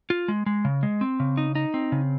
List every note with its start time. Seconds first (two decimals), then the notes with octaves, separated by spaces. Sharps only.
0.10 F4
0.28 G#3
0.46 G#3
0.65 C#3
0.83 G#3
1.01 C4
1.20 C#3
1.37 D#4
1.55 D#4
1.74 C4
1.92 C#3